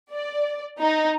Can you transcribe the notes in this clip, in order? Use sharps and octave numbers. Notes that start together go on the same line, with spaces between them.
D5
D#4